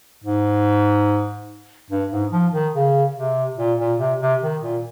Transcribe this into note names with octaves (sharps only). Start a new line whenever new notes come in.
G#2
G2
G#2
F3
D#3
C#3
C3
A#2
A#2
C3
C3
D#3
A#2